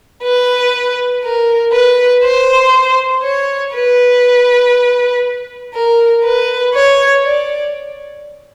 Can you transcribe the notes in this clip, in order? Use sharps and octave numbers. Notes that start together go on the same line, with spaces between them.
B4
A#4
B4
C5
C#5
B4
A#4
B4
C#5
D5